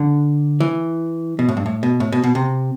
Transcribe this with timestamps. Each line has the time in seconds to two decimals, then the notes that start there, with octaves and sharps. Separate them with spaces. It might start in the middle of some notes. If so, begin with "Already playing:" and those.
Already playing: D3
0.60 E3
1.39 B2
1.49 A2
1.57 G2
1.66 A2
1.83 B2
2.00 A2
2.12 B2
2.24 B2
2.35 C3